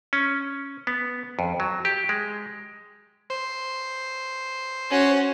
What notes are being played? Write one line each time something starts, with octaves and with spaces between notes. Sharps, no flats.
C#4
B3
F2
F#3
G4
G#3
C5
C#4 F#4